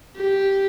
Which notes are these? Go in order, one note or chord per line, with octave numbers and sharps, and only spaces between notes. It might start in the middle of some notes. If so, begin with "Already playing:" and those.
G4